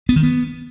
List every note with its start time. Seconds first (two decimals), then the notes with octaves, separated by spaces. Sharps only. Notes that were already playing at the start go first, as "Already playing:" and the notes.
0.09 B3
0.16 D#3
0.23 B3